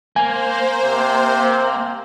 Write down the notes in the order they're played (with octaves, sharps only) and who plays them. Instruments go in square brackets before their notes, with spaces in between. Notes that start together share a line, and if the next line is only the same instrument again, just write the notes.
[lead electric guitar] A#3 [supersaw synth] C5 [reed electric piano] G#5
[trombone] C3